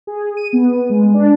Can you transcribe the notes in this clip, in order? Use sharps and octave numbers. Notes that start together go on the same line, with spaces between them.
G#4
D#7
B3
G#3
D4